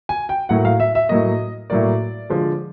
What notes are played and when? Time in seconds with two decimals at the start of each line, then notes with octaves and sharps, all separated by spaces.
0.09 G#5
0.29 G5
0.49 A2 F#3 A#3 F#5
0.65 F5
0.80 E5
0.95 E5
1.09 A2 F#3 A#3 D#5
1.70 A2 F#3 A#3 D5
2.30 D3 F3 G#3